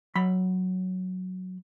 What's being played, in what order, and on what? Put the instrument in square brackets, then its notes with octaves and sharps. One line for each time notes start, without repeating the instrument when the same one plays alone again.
[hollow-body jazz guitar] F#3 B5